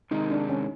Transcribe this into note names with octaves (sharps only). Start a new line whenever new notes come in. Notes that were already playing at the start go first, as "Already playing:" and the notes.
C3 D#3 G#3 D#4
D4
C#4